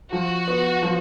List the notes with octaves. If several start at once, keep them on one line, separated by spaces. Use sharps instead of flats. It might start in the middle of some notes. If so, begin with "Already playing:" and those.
F3 F#4
B3
F3